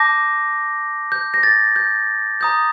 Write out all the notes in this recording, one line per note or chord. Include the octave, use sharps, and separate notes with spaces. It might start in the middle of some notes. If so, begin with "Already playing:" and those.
Already playing: A5 D6 G6 A#6
G6
A#6
A6
G6
A#5 D#6 G6